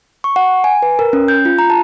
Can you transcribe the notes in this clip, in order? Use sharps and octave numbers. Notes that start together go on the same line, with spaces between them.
C#6
F#5
G#5
B4
A#4
C#4
G6
F4
A#5
A5